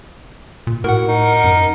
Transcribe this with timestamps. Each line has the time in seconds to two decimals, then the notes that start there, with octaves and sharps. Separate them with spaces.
0.67 A#2
0.84 A2 F#4 A#4 F#5
1.08 D#4
1.44 F#2